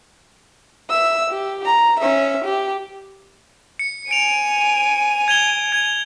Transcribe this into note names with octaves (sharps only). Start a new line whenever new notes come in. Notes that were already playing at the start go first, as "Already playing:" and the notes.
E5 E6
G4
A#5
C#4 E5
G4
C#7
G#5 D7 D#7 F7
G#6 F7 G7
G#6